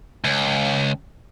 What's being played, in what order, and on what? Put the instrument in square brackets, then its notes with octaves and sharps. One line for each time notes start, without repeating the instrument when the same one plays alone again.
[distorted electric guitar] C#2